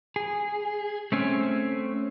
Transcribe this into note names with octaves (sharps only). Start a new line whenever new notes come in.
G#4
A3 C4 C#4